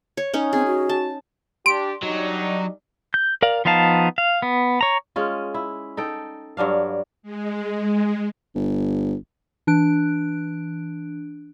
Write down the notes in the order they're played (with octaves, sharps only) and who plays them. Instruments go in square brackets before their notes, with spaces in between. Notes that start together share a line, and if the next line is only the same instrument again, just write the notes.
[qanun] C#5
C#4 D#4 C#5
[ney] C4 [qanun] G#4
[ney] F#4
[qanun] A5
[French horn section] D4 G4 [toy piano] C6 [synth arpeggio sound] D7
[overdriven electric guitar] F#3 [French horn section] G3 D4 D#4
[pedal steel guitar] G6
A#4 D5 F5
F3 B3 D#4 F5 A5
F5
B3
C#5 A#5
[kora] G#3 C#4 F4
E4
D#4 A4 G5
G2 F#3 D4 F5
[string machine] G#3
[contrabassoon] G1
[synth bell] E3 D4 F#6 D7